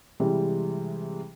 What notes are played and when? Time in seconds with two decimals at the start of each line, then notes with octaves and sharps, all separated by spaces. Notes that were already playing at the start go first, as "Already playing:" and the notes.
0.20 C3 E3 G3 G#3